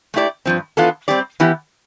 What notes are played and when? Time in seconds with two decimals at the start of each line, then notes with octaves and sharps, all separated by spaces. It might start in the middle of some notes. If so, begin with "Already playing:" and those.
0.14 A3 E4 G4 D5
0.46 G2 F3 C4
0.77 E3 B3 D4 F4 A4
1.08 G3 C4 G4 D5
1.40 E3 B3 E4 G4